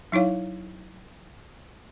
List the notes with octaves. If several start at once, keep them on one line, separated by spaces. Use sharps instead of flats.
F#3 D#4 E4 C#5 F5